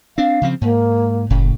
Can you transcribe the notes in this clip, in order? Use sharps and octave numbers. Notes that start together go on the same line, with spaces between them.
C4 D4 F5
C#3 F3 C4
G#2 A#3
F#1 A2 C#3